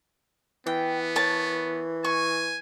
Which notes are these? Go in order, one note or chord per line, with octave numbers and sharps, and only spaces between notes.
E3 B3 G5
A#4 C#5 A5
G#5 C#6